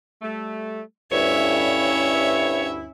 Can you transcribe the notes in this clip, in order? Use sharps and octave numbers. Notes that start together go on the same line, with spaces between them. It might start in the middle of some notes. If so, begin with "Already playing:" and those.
G3 A3
D2 G2 C#4 E4 C#5 E5